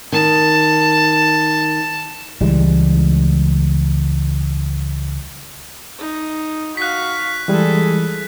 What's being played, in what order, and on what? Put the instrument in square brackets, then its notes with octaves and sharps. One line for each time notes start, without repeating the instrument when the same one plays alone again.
[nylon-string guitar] D#3 [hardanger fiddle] A5
[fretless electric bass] C#2 E3 G3 G#3
[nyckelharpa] D#4
[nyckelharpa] F#4 F5 [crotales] F#6 B6
[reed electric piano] E3 G3 G#3 [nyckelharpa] G#4 A4